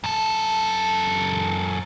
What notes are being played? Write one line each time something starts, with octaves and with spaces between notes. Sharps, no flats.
F#2 A4